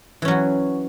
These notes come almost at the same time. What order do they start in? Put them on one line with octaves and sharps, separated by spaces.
E3 C#4 F#3 F#4